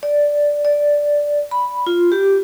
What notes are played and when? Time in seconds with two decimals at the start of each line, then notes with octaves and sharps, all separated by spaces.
0.03 D5
0.65 D5
1.51 B5
1.87 F4
2.12 G4